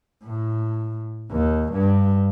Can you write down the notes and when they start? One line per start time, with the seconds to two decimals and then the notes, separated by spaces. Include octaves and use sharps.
0.23 A2
1.31 D#2
1.73 G2